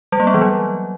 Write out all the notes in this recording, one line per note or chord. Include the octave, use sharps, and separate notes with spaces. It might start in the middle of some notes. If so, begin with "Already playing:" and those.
G3
A#3
B3
E3
F#3